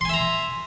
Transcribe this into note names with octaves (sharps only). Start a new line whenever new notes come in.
E5 G#5 A#5 C6